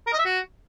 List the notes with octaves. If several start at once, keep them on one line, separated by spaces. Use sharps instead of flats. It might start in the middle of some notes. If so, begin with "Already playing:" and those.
A#4
D#5
E5
F#4